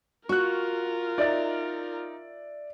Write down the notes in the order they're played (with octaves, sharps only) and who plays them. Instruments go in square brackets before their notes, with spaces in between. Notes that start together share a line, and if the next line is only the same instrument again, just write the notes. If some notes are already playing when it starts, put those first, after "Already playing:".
[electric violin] F4 A#4 [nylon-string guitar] F#4 [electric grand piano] C#6 F#6
[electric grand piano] D#4 [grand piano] D5 E5 A6